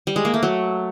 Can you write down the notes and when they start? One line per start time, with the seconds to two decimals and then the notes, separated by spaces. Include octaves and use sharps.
0.07 G3
0.16 G#3
0.25 A#3
0.34 A3
0.43 F#3